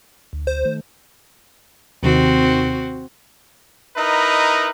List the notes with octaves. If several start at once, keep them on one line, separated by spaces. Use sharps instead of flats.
D2
C5
D#3 A3
D#2 C3 D#3 C4 F#4
D#4 E4 A#4 B4 D#5